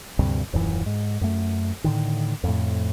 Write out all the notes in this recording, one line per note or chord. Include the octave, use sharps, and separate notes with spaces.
D2 G2 C3
D#1 F#2 E3
G#2
F#2 A3
A2 D3 D#3
F2 A2